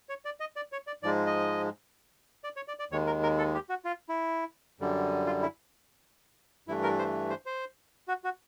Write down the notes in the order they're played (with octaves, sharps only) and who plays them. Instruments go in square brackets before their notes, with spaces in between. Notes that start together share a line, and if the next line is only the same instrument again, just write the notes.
[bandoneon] C#5
D5
D#5
D5
C#5
D5
G#2 F3 G#3 D5
D#5
D5
C#5
D5
D5
D#2 D#3 G#3 C#5
A#4
A#4
A4
G4
F#4
F4
E4
F#2 D3 G3
F4
E4
G2 E3 A3 E4
A#4
C5
C5
C5
F#4
F#4